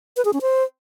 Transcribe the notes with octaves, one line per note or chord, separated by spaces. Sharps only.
B4
G#4
C#4
C5